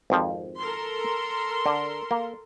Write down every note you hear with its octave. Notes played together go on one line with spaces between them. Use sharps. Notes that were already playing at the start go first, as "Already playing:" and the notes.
G#1 F2 F3
A4 A#4 C6
D3
A#3